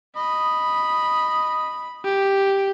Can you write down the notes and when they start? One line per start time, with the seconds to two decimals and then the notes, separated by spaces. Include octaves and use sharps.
0.17 D#5 B5
2.04 G4